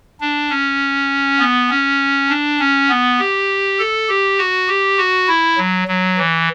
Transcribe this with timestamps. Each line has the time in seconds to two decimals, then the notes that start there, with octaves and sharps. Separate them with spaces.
0.20 D4
0.50 C#4
1.39 B3
1.70 C#4
2.29 D4
2.60 C#4
2.89 B3
3.19 G4
3.79 A4
4.09 G4
4.38 F#4
4.68 G4
4.98 F#4
5.28 E4
5.58 F#3
5.88 F#3
6.18 E3